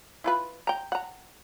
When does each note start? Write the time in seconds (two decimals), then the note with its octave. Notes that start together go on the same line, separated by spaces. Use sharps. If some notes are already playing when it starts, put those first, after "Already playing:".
0.24 E4 F4 B4
0.67 G5 A#5
0.92 F#5 A#5